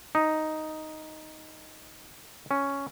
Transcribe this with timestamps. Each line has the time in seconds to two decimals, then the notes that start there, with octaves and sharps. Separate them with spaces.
0.15 D#4
2.51 C#4